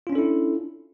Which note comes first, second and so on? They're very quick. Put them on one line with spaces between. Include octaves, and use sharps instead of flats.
F4 C#4 D4 A4 E4